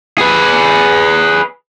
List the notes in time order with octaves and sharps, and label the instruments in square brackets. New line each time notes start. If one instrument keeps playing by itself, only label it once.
[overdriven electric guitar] G#4 B4